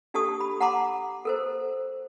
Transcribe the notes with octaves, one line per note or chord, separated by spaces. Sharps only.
D4 G4 A4 A5 C#6 D#6
B5
F#5 A5 A#5 C6 D6
A4 A#4 C5